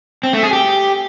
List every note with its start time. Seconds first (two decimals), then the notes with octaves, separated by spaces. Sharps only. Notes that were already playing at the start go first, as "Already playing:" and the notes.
0.23 C4
0.33 A3
0.43 G#4
0.53 G4